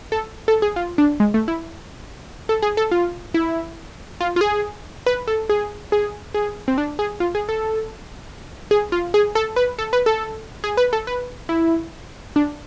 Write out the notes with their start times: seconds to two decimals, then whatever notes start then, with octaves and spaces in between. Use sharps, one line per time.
0.12 A4
0.48 A4
0.62 G#4
0.76 F4
0.98 D4
1.20 G#3
1.34 A3
1.48 E4
2.49 A4
2.62 G#4
2.77 A4
2.91 F4
3.34 E4
4.21 F4
4.36 F4
4.41 G#4
5.06 B4
5.28 A4
5.49 G#4
5.92 G#4
6.34 G#4
6.68 C4
6.78 D4
6.99 G#4
7.20 F4
7.35 G#4
7.49 A4
8.71 G#4
8.92 F4
9.14 G#4
9.35 A4
9.56 B4
9.79 A4
9.93 B4
10.06 A4
10.64 G#4
10.77 B4
10.93 A4
11.07 B4
11.49 E4
12.36 D4